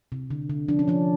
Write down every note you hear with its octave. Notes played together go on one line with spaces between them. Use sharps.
C3
D3
D3
F3 D4
C#4
F3 D4